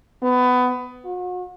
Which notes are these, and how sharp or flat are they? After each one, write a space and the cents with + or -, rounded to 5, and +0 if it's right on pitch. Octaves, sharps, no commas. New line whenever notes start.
B3 +20
F#4 -40